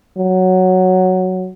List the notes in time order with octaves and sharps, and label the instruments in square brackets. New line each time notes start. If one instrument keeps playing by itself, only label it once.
[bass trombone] F#3